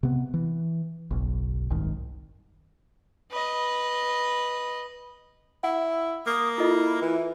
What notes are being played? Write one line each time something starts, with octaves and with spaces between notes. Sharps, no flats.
C3 B3
E3
F#1 B1
F#1 C2 G#2 D#3
B4 D#5
E4 F#5
A#3 D#6
E4 F4 A4 D#5
E3